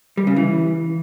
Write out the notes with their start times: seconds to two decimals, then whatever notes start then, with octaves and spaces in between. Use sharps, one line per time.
0.17 G3
0.27 C#3
0.36 E3